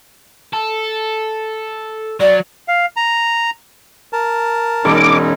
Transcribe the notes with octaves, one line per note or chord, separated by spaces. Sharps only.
A4
F#3 D5
F5
A#5
A#4 A5
E1 C#4 D#4 D6